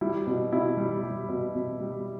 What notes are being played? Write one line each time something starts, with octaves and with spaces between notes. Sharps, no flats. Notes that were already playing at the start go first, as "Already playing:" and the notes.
G3 E4
B2
B2 E4
G3
G3
B2
B2
G3